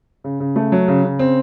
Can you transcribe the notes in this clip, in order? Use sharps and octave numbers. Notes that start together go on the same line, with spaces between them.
C#3
C#3
A3
F#3
C#3
C#3
C4